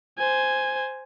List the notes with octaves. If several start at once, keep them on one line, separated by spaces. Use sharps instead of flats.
C5 G#5